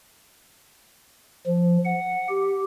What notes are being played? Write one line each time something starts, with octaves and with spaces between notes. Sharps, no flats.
F3
F#5
G4